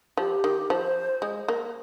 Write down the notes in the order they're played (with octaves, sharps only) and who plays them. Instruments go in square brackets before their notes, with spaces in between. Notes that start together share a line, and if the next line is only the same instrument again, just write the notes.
[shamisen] F3 [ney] G4
[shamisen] D#3
[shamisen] F3 [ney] C5
[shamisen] G#3
A#3